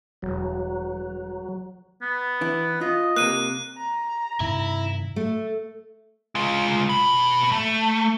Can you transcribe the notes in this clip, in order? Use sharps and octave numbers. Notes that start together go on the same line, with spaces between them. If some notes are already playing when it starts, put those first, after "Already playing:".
E1 F#3
B3
E3 E4
F4 D#5
C3 A#3 F#6 D#7
A#5
G2 C3 D#3 E4
A3
G#3 F4
B2 B5
A3